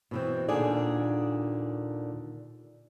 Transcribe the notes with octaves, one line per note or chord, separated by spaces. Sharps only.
B2 E3 C4
D#2 A#2 D3 G#4 D5